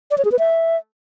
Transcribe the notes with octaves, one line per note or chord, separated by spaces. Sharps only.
D5
C#5
G#4
B4
E5